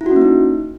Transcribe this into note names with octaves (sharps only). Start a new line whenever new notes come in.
E4
F#4
C#4
A#3
D#4